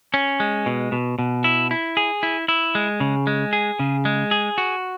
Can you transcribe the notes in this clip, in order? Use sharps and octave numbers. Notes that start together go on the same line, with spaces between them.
C#4
G#3
B2
B2
B2
E4
E4
G#4
E4
E4
G#3
C#3
G#3
G#4
C#3
G#3
G#4
F#4